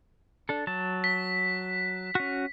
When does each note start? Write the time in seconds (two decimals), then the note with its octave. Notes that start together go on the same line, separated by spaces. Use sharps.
0.49 D4 A4
0.67 F#3 A5
1.04 B6
2.15 C#4 F#4